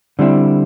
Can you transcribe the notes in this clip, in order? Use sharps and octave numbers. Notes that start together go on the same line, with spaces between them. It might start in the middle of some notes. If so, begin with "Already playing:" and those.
D3 G3 C4 E4